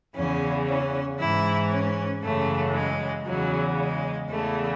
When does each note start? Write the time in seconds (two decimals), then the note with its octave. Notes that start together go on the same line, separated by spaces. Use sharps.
0.15 E2 C#3 E3 C#4
0.67 C#4
1.19 G#2 E3 E4
1.71 C#4
2.23 F#2 C#3 E3 A3
2.74 G#3
3.25 E2 C#3 E3 F#3
3.78 G#3
4.29 E2 C#3 E3 A3